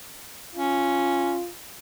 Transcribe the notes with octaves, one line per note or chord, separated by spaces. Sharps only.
C#4 F4